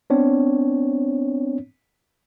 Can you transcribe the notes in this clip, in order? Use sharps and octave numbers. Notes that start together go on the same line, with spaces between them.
B3 C4 D4 C#5